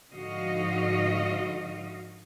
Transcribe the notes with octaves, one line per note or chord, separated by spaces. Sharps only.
G#2 D3 F3 F#4 D#5 F5